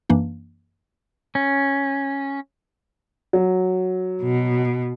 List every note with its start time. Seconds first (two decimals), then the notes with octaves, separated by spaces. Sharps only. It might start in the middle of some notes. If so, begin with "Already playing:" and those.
0.10 F#2 E3 A#3 D4
1.35 C#4
3.33 F#3
4.22 B2